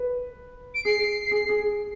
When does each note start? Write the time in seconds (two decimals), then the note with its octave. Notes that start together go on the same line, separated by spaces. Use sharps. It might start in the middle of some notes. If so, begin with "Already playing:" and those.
Already playing: B4
0.75 D7
0.85 G#4 C7
1.31 G#4
1.49 G#4